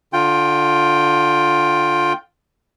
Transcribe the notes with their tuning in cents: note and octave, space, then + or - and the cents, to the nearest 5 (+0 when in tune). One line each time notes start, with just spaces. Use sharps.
D3 +0 F4 +15 G5 +0